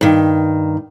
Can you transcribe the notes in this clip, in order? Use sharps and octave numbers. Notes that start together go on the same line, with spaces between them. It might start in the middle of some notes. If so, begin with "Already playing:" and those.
G2 D#3